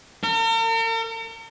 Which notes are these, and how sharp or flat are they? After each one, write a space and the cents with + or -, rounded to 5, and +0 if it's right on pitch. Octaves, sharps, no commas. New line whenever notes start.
A#4 -45